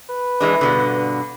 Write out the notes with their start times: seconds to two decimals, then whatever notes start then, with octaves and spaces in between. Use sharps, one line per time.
0.09 B4
0.40 E3 G#3 D4
0.61 G2 B2 D3